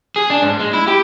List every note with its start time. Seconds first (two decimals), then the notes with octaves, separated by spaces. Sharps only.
0.16 G#4
0.30 D4
0.42 G#2
0.60 G#3
0.73 E4
0.87 G4